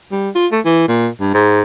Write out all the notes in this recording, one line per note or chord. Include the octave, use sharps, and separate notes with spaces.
G3
F4
A3
E3
A#2
G2
G#2